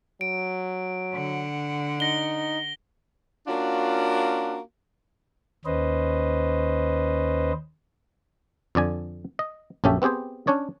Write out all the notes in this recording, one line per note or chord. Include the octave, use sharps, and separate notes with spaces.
F#3 D7
D3 F#5
D#4 A#6 G7
A#3 C#4 D4 F4 F#4
D#2 C#4 B4 C5 D#5
F2 D3 D5 G#5
D#5
A#1 F#2 C#4 G4 A4 E5
B3 C4 G4 G#4 C5
C#4 D4 C#5 D5